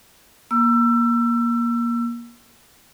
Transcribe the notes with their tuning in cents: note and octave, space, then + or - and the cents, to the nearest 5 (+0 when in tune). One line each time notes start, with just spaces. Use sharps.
A#3 +20 E6 +25